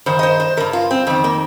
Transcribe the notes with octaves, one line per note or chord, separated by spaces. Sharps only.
G2 D#3 C5
D#5
C5
C5
G2 D#3 A#4
F4
C4
F2 D#3 C4
A#3